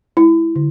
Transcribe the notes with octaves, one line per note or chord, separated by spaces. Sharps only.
G#3 E4
D3